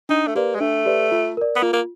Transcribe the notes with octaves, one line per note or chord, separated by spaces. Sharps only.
D4 D#4
A3
A#3 G4 B4 D5
G#3
A3 D4
G4 B4 D5
F4
A#4 D5
B3
A#3 F4
A#3